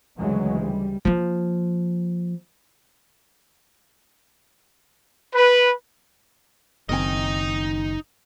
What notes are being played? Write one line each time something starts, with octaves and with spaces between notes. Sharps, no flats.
D2 C#3 E3 F#3 G#3
G3
F3 A#3
B4
F#1 D#3 C4 D#4 D#5 G#5